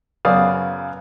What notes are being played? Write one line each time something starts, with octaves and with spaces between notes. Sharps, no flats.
F#2 C#3 B3 D5 F5 D#6